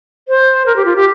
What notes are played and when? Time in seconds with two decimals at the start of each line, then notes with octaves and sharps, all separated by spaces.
0.28 C5
0.66 A#4
0.76 G4
0.85 F4
0.96 G4